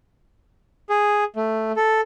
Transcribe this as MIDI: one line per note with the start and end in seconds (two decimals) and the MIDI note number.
0.90 1.24 68
1.36 1.72 57
1.76 2.01 69